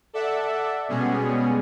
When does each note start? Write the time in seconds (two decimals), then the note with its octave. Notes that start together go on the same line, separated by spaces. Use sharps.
0.13 A4 D5 E5 F#5
0.88 B2 G3 G#3 B3 C#4 G#4